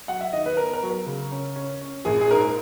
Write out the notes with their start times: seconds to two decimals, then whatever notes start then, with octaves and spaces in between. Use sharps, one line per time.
0.08 F#3 F#5
0.21 E5
0.33 D#3 D#5
0.46 B4
0.57 B3 A#4
0.74 A#4
0.83 F#3
0.90 A#4
1.06 C#3
1.32 C#4
1.56 C#4
1.81 C#4
2.05 A#1 G#4
2.21 G#4
2.31 G#2 A#4